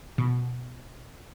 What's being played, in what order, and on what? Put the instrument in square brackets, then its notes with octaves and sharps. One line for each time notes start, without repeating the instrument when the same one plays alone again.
[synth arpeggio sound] B2